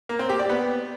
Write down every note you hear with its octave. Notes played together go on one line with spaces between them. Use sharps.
A#3
C4
G4
D5
B3